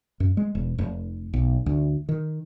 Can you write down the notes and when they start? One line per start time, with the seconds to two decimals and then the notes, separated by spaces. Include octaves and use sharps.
0.20 F#2
0.37 G#3
0.55 E1
0.78 F1
1.34 B1
1.66 D2
2.09 D#3